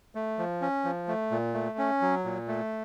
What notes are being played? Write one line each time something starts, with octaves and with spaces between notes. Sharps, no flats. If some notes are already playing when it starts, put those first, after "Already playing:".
A3
F3
C#4
F3
A3
A#2
A3
C#4
F#3
A#2
A3